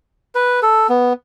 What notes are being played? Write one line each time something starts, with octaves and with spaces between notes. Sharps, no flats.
B4
A4
B3